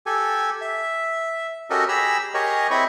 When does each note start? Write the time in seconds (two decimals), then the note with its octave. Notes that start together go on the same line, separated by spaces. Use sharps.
0.06 G4 A4 G#5
0.61 E5
1.70 C#4 F#4 G4 A4 A#4 D#5
1.89 G4 G#4 A#5 B5 E6
2.34 G4 G#4 A#4 C#5 D#5
2.71 C4 E4 D#5 B5 C#6